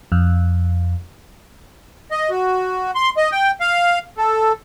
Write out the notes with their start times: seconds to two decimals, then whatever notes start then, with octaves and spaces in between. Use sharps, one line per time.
0.12 F2
2.11 D#5
2.30 F#4
2.95 C6
3.17 D#5
3.32 G5
3.61 F5
4.18 A4